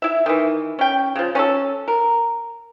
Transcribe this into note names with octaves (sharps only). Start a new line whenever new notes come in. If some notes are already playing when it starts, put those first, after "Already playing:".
E4 E5
D#3 E3
C#4 G5
C#3 F3
C#4 F#4 A4
A#4